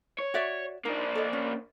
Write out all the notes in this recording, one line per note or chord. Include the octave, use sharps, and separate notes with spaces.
C#5
F#4 D5 E5
A#3 D4 D#4
A4 D#5
C#4